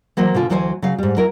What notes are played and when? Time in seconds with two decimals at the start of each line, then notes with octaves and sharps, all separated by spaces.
0.17 E3 F#3 A#3 C5
0.34 B2 D3 F4 G#5
0.50 D2 E3 F#3 C5 G5 G#5
0.82 C#3 F#3 F5
0.98 G#2 G3
1.17 F#3 E4 A#4